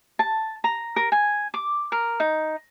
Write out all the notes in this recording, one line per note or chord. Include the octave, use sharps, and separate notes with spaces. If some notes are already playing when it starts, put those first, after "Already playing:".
A5
A#5
A#4
G#5
D6
A#4
D#4